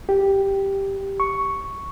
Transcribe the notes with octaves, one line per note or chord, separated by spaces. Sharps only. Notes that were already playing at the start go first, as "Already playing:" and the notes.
G4
C#6